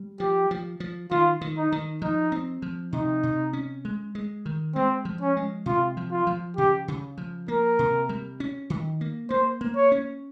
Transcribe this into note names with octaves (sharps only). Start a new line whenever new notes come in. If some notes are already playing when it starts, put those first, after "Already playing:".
Already playing: G3
F3 G4
F3
F3
D#3 F4
D#3
D#4
D#3
F3 D#4
C4
F3
C3 D#4
C3
C#4
G#3
G#3
D#3
G#3 C4
F3
C#4
G#3
C3 F4
F3
F4
F3
C#3 G4
C#3
F3
A#3 A#4
C3
G3
C#4
D#3
A#3
A#3 C5
A#3
C#5
C#4